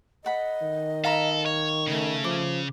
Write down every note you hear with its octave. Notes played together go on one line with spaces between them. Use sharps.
A4 D#5 F#5 B5
D#3
A4 F5 A#5 B5
C#5
C#3 A3
F3 D6